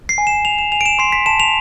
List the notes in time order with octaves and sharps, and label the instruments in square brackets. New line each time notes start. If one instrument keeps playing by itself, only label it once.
[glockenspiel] C7
G#5
E7
G#5 F7
E7
G#5 F7
D7
E7
C6 C7
B6
A5 E7
F7